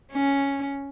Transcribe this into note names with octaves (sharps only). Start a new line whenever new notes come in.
C#4